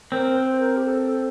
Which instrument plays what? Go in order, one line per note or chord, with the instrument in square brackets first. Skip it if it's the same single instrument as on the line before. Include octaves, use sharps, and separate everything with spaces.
[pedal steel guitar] C4 [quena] A#4
[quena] C5
C5
A#4
G4
A4